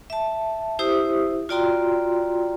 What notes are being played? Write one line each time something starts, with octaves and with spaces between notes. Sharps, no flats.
E5 A5
E4 G4 C5 E5 D#6
F4 F#4 D5 G5 A#5 C6